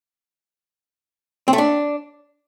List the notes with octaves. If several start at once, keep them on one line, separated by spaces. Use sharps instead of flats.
C4
A3
D4